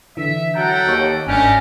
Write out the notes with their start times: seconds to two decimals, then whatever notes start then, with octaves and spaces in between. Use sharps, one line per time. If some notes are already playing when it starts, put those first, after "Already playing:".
0.17 D3 E3 E5
0.55 F#3 A4 F#5 G5 A#5
0.86 D#2 C#5 D#5
1.27 G1 G#2 A3 C#4 D4 G4 A#4